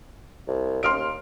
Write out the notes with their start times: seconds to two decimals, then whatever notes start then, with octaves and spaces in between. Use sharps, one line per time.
0.48 C2
0.83 D#2 C6 F6 D7